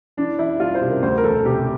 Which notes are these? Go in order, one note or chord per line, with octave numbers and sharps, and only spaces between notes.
E3 D4
E3 E4
C2 F4
C5
C3
A#4
D2 C5
A#4
E1 A4
C3 G4